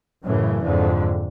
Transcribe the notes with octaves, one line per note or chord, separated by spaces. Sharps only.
F#2 A2 C#3 E3
F2 G#2 D3